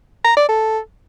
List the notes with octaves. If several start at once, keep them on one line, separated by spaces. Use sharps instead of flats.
A#5
D5
A4